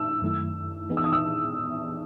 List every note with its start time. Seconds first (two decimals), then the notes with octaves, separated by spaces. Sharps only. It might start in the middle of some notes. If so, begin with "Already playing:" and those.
Already playing: E6
0.22 F#2 D#3 A3 E4
0.89 E3 B3 D#4 G#4
0.97 E6
1.04 D#6
1.13 E6